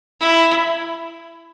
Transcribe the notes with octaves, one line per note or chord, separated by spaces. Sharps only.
E4